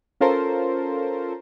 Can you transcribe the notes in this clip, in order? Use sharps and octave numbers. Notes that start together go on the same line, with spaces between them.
C#4 F4 A4 A#4 C5